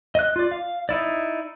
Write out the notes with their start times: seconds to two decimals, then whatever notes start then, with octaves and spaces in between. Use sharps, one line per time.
0.15 D#5 F#6
0.36 F4 D5
0.51 F5
0.89 D#4 E4 D5